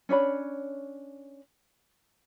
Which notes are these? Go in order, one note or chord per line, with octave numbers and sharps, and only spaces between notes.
C#4 D4 C#5 B5